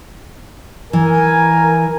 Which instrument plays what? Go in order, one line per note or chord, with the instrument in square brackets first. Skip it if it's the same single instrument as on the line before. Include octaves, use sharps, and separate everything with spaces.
[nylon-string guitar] E3 [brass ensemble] A#4 G#5